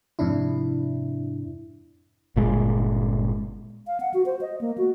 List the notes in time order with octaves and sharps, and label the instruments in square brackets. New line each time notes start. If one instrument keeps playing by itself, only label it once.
[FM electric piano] F2 G#2 C3 D4 E4
[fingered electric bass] G1 A#2 G#3
[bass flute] F5
F#5
F#4
C5
D#5
A#3
F#4